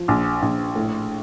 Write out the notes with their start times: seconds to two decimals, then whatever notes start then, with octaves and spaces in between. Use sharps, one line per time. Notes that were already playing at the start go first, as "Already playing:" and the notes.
Already playing: F3
0.08 A#1
0.42 A#1
0.76 A2